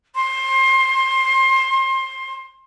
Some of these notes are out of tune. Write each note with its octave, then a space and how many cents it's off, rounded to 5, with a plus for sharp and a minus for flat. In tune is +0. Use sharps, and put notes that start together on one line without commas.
C6 +25